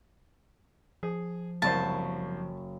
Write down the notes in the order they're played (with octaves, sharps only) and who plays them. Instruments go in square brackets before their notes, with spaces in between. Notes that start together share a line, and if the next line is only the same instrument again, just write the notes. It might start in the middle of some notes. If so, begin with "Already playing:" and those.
[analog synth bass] F3 [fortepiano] G#4
[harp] F#1 C#6 [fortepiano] C2 C5 [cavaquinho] A5